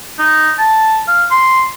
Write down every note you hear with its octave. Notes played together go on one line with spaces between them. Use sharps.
D#4
A5
F5
C6